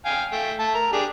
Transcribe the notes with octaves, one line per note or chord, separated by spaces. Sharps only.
F5 G5 G#5
A3 G5
A3 A5
A#4
D4 G4 G#4